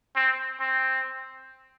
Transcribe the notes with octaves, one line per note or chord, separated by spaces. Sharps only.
C4
C4